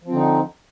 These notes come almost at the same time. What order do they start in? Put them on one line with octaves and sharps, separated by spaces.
F3 C4 D3 D#4